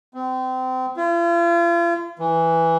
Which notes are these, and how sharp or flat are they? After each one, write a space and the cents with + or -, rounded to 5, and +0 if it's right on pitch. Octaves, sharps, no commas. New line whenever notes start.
C4 -30
F4 -40
E3 +0